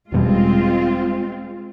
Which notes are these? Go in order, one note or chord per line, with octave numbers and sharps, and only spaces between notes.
E1 B2 G3 G#3 C4 F4